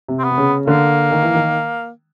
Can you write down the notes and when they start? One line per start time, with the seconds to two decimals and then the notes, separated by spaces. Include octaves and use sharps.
0.08 C3
0.19 C4
0.24 B3
0.31 C3
0.38 C#3
0.67 D3 A#3
1.11 D#3
1.23 E3
1.35 D#3